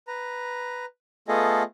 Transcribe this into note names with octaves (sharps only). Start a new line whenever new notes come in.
B4 A#5
A3 B3 F4 G#4 A4 D#5